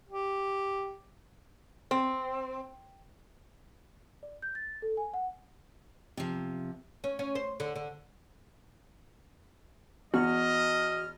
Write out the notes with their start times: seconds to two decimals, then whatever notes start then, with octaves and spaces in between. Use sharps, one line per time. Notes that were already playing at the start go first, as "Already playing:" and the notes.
0.09 G4
1.91 C4
4.23 D5
4.42 G6
4.55 A6
4.82 A4
4.97 G#5
5.14 F#5
6.17 C3 F3
7.04 C#4
7.19 C#4
7.35 C5
7.60 D3
7.76 D3
10.14 E2 F#4 D#5 F#5 F6